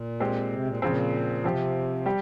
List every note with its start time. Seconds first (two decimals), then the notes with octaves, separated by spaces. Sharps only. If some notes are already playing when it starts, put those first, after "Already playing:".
Already playing: A#2
0.20 G#3 C4 G4
0.52 C3
0.66 A#2
0.82 A#2 C#3 F3 C4
1.44 C3 F3 C4 G4
2.06 G3 G4